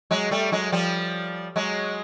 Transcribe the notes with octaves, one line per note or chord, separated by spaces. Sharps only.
F#3 G#3
G3 A3
F#3 G#3
F3 G3
F#3 G#3